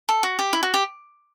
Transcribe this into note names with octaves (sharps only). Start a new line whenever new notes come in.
A4
F#4
G4
E4
F#4
G4